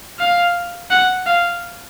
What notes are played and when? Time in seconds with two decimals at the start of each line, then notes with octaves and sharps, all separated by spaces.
0.19 F5
0.91 F#5
1.27 F5